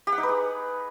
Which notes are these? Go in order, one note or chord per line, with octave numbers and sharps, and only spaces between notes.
G4
F#5
D#4
B4
G#4